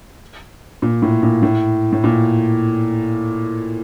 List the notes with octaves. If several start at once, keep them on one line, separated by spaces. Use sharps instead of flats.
A#2
A2
A#2
A2
A2
A#2